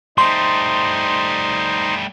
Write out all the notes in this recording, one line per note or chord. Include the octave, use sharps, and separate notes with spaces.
G3 A3 D#4 C5 C6